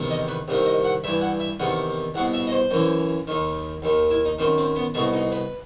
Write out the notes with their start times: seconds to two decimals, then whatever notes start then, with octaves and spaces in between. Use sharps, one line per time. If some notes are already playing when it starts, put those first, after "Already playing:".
Already playing: E2 C3 D#3
0.11 D#5
0.28 B4
0.48 C2 C3 D#3
0.66 D#5
0.84 F#5
1.04 G2 E3 E5
1.21 F#5
1.40 E5
1.60 E2 C3 D#3 F#5
2.14 C2 B2 F#5
2.34 E5
2.47 D#5
2.52 C5
2.71 F#2 E3
3.27 D#2 D#3
3.82 D#2 D#3
4.10 E4
4.25 D#4
4.39 F#2 D#3 C4
4.58 C4
4.76 B3
4.94 C2 B2 A3
5.13 D#4
5.32 B4